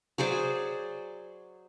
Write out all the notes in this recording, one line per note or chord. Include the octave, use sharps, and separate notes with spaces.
F#3 G#4 C5 D5